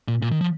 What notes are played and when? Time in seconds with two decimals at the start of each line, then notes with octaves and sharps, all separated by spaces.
0.08 A#2
0.22 A#2
0.32 D#3
0.41 F3